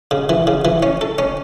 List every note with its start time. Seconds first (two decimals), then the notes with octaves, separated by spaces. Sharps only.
0.11 C#3
0.29 E3
0.47 C#3
0.65 E3
0.83 C#4
1.01 A4
1.19 C#4